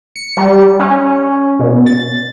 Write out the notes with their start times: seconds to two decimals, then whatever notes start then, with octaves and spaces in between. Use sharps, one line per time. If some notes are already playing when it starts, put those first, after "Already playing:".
0.16 C#7
0.37 G3
0.79 C#4
1.59 B2
1.86 A6